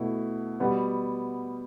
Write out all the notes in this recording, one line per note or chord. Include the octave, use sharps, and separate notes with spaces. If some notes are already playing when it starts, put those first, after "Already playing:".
Already playing: B2 A3 E4
B2 G3 B3